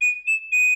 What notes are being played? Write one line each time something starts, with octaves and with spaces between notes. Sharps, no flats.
D#7
E7
D#7